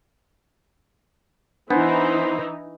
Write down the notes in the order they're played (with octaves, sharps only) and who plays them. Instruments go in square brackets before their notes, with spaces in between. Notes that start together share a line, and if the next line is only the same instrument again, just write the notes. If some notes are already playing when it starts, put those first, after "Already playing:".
[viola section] E3 D#4 [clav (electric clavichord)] B3 [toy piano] D4 [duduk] C5